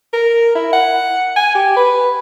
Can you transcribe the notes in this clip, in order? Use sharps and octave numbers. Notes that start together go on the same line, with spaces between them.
A#4
E4
F#5
G#5
G4
B4